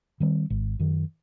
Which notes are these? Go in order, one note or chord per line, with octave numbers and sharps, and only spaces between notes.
D#3 G3 C4
G#1
F#2 D#3